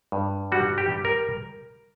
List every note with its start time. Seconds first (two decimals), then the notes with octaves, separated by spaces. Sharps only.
0.12 G2
0.52 G3 F#4
0.78 G4
0.92 G3
1.05 A#4